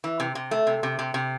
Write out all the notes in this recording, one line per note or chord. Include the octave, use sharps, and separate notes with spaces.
E3
C3
C3
A3
C3
C3
C3
C3